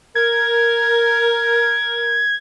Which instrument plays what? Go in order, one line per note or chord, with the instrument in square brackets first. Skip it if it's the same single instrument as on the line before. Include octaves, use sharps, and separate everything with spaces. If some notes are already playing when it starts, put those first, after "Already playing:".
[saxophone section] A#4 [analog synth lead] G#6